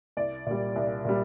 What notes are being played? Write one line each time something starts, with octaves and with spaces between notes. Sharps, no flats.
C2 D5
A#2 G3
C2
A#2 G3